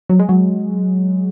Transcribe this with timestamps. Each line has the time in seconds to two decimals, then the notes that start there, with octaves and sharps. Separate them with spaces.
0.10 F#3
0.19 G#3
0.29 F#3